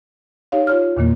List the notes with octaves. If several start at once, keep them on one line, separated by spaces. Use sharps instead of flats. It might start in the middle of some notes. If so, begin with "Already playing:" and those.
D#4 G4 C#5 F5
F4 C#5 F6
E2 A#2 D#3 A#3